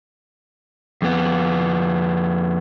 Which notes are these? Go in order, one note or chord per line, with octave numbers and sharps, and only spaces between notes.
F2 B3